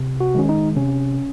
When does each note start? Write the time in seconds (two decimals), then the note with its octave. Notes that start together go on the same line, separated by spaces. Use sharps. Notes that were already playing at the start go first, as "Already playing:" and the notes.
Already playing: C3
0.20 F#4
0.35 D#3 G#3 C#4
0.49 D#4
0.76 C3 C#4